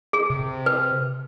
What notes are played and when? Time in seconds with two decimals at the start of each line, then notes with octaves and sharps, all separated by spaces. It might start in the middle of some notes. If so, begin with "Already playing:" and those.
0.13 G#4
0.30 C3
0.66 B4